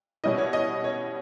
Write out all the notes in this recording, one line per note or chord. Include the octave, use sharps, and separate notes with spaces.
B2 G3 C#4 E4 D#5
C#5
D#5
C#5